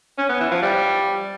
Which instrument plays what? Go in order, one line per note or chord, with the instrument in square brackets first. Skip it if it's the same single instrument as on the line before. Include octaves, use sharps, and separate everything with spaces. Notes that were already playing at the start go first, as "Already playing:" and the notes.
[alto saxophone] C#4
B3
E3
F3
G3